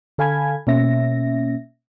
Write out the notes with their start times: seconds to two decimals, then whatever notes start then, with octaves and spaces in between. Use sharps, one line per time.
0.18 D3 A4 F5 G#5 B5 G#6
0.67 B2 A#3 C#4 E5 A#6